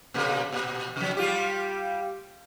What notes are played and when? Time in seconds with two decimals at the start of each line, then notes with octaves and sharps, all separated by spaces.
0.14 A#2 C#3 A#3
0.53 A#2
0.96 C3 F#3
1.17 G3 F4 G4